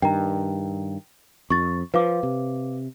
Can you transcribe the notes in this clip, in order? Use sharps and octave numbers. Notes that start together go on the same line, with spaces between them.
G2 D#3 G5 A#5
F2 C#6 A6
F3 B4 F5 D6
C3